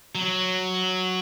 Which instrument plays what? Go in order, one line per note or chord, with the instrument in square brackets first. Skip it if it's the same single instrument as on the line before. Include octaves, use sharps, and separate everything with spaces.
[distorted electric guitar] F#3